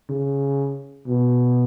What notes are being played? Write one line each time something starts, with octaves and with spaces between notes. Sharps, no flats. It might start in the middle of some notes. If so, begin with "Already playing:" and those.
C#3
B2